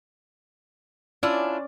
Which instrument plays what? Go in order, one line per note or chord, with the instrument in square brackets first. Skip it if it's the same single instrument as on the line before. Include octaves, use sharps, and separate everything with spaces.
[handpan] C#4 D5 [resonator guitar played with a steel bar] D4 E4 F4